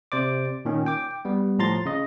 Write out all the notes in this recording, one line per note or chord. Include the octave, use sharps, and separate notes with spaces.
C3 C5 D5 D6
A#2 D#3 C#4
G5 D6
G3 B3
A2 F3 A#5 C6 A6
C#3 D#5